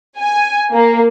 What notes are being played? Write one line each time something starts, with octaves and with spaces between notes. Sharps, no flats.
G#5
A#3